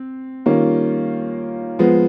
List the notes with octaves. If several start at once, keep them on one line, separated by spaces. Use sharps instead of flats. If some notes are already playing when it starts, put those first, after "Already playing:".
Already playing: C4
D#3 G3 A#3 C#4 F4
F3 G#3 B3